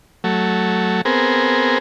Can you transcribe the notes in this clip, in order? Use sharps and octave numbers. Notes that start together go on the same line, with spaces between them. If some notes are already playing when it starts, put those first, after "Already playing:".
F#3 A3
B3 C4 G#4 A#4